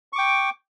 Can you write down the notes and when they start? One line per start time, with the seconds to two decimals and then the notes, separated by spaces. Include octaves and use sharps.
0.13 C#6
0.16 D6
0.18 G5